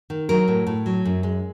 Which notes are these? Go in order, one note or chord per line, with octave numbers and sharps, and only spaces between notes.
D#3
F#3 A#4
A2
A2
F#3
F#2
G#3